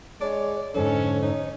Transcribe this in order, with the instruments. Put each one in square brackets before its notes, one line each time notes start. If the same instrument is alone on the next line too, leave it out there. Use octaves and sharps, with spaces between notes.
[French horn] G#3 [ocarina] C#5 [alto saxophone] D5
[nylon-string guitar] F2 G#2 D3 [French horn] C#4 [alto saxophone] A4 [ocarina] C#5
[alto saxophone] D#4